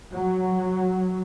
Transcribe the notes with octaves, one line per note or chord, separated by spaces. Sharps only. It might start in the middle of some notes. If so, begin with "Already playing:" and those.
F#3